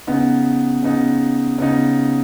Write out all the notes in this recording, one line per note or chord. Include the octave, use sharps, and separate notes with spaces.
C#3 B3 D#4
C#3 B3 D#4
C#3 B3 D#4